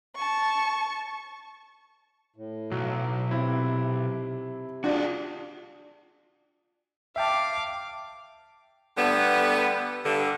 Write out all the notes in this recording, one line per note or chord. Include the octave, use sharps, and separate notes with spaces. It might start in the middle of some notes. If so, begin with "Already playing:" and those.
A5 C#6
A2
B1 F#3
C3 C4 E4
D4 F4 F#4 G#4
E5 F5 G5 A5 D6
D3 G3 A3 B3
G2 D3